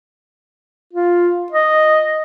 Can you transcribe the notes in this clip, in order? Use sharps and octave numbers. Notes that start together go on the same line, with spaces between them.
F4
D#5